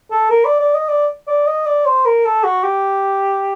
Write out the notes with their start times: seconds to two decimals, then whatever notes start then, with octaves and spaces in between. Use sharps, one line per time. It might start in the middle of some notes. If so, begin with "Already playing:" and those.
0.11 A4
0.30 A#4
0.45 D5
0.60 D5
0.74 D#5
0.89 D5
1.28 D5
1.47 D#5
1.66 D5
1.86 C5
2.06 A#4
2.25 A4
2.44 F#4
2.63 G4